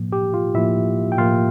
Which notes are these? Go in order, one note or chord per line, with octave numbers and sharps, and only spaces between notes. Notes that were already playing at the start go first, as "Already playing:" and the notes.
Already playing: A2 F3 A#3
G4
F4
A2 F3 A#3 E4 E5
G5
A2 F3 A#3 F4 F5